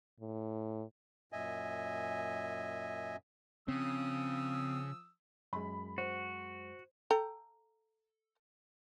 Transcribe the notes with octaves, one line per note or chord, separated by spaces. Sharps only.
A2
F#2 A#2 D#5 E5 G#5
C#3 F3 C4 D#6 E6
F#2 G#3 B5
F#4 C5
A4 G5 A#5